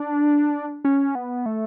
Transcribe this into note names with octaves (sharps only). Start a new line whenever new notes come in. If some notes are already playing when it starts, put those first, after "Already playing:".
Already playing: D4
C#4
B3
A3